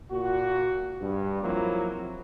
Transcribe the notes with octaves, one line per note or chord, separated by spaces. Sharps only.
A#2 F#4
G2
F3 F#3 A#3 C4 E4